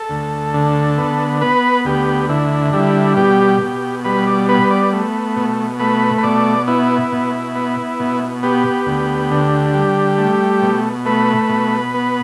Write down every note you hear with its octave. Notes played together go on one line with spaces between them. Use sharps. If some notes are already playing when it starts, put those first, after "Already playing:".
Already playing: A4
D2
D3
B3
B3 B4
D2 G4
D3 E4
G3 E4
B2 G4
B2
G3 B4
D5
B3 B4
D5
A3
B2
A3 B4
B4
B2 D5
B3 E4
B2
B3
B2
B3 G4
D2
D3
G3
A3
B2
A3 B4
B2
B3